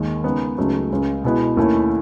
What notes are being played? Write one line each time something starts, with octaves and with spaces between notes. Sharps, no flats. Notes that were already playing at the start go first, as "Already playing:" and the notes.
Already playing: D#2 D#3 G#3
C#3 G#3 B3 D#4
C#2 C#3 F#3 A3 D#4
C#2 C#3 G#3
B2 G#3 B3 E4
D#2 D#3 A3 C#4 E4